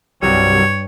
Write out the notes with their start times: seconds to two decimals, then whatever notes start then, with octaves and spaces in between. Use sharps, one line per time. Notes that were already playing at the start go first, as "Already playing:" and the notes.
0.22 C2 G2 F#3 G3 C#5